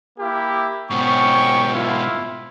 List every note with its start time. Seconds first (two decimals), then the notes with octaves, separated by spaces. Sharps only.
0.19 A#3 E4 G4
0.90 G#2 B2 C#4 G5 C#6
1.74 E4 F4